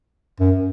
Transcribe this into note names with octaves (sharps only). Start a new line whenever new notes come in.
F#2